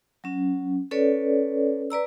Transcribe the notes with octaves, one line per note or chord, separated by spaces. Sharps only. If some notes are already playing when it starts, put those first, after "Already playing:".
F#3 C#4
C#4 A4 B4 C#5 D5
B4 D5 A#5 E6